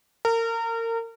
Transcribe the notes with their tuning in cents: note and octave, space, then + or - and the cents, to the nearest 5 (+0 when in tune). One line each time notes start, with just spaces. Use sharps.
A#4 -30